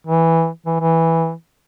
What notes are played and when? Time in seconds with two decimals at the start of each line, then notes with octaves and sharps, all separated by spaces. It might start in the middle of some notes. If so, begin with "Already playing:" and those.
0.07 E3
0.66 E3
0.81 E3